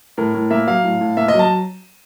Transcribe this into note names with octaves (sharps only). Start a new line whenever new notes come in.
A2 A#4
A2
A#3 E5
F#3 F5
A2
A2
A#3 E5
D#5
F#3
A5